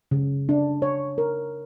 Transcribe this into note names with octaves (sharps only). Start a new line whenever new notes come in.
C#3
D4
C#5
A#4